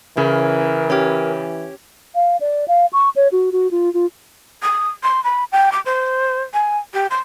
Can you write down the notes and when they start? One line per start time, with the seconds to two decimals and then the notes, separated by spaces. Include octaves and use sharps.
0.17 C#3 E3 C#4 E4 A#4
0.90 C#4 G4
2.15 F5
2.40 D5
2.68 F5
2.93 C#6
3.16 C#5
3.32 F#4
3.52 F#4
3.71 F4
3.94 F4
4.62 D#6
5.03 C6
5.24 B5
5.52 G5
5.72 D6
5.86 C5
6.54 G#5
6.94 G4
7.11 C6